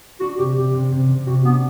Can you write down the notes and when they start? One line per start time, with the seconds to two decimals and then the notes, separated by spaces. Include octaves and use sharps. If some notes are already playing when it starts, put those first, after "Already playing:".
0.20 D4 F#4
0.39 C3 G4
0.56 C3 G4
0.74 C3
0.92 C3
1.09 C3
1.27 C3 F#4
1.45 B3 D4